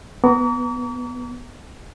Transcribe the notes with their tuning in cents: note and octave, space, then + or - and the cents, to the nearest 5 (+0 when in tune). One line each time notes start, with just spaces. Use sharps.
B3 +0 A#5 -15 D6 -45